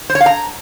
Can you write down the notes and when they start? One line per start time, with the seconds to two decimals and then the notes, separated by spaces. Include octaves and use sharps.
0.10 C5
0.15 C#5
0.21 F5
0.26 A#5